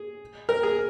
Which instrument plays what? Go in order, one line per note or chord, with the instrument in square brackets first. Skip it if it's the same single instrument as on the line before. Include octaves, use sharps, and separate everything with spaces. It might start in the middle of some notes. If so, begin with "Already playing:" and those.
Already playing: [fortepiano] G#4
A#4
G#4